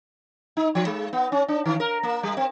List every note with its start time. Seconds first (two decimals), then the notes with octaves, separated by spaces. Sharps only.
0.57 D#4
0.75 F3
0.87 G#3
1.13 B3
1.32 C#4
1.48 D4
1.66 D#3
1.80 A#4
2.03 A#3
2.23 G3
2.37 C4